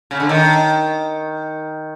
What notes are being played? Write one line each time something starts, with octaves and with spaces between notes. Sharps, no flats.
C#3
D3
D#3